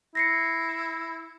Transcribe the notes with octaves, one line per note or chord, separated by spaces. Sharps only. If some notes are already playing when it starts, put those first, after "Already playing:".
E4 A#6 C7 C#7